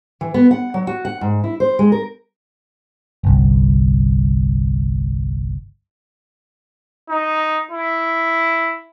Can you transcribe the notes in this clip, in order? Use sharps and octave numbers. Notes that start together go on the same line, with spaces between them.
E3
B3
F#5
F#3
F#4
F#5
G#2
E4
C5
G#3
A#4
G1 C2
D#4
E4